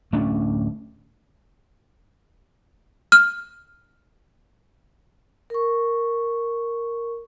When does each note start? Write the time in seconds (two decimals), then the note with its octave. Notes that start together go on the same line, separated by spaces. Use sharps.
0.12 D1 A3 C#4 D4
3.12 F6
5.50 A#4 C#6